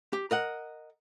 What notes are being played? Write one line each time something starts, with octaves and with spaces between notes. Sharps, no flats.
G4
A#4 D#5 F#5